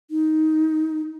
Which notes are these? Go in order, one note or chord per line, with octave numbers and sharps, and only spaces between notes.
D#4